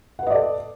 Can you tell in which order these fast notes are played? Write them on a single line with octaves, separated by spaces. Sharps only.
F#5 B4 D#5 D5 A4